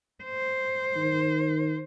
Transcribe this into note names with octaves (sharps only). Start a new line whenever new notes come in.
C5
D#3